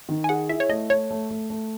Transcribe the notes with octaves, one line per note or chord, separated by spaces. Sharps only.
D#3
G#5
G#4 F#5
E4 E5
C#5
A3 D#5
A3 C#5
A3
A3
A3